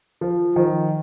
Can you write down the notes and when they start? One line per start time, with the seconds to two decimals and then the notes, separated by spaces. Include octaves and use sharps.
0.21 F3
0.56 D#3 F3